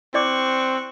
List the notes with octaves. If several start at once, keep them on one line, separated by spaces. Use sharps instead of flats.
C4 E4 D5 C#6 D6 F#6